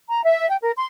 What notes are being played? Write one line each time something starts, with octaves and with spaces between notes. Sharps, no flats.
A#5
E5
G5
A#4
C6